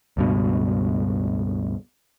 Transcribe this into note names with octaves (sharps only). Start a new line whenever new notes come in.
C#2 G2 B2